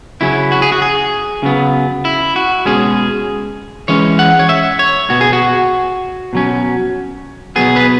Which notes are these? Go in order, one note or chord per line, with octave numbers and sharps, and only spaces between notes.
C#3 F#3 C#4 E4
F#4
G#4
F#4
G#4
C#3 F#3 B3
E4
F#4
B2 G#3 C#4 G#4
E3 G#3 C#4 C#5
F#5
C#5
E5
C#5
B2 B3 F#4
G#4
F#4
B2 F#3 C#4
B2 F#3 B3 G#4
B4